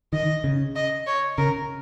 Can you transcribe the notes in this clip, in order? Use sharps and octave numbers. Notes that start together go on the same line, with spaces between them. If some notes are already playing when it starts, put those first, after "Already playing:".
D#3 D#5
C#3
D#5
C#5
C#3 A#4